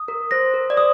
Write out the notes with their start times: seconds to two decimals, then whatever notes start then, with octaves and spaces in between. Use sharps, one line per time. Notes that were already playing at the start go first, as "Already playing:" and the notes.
Already playing: D#6
0.08 A#4
0.31 C5 A#6
0.54 A#4
0.70 D5
0.77 C5 D#6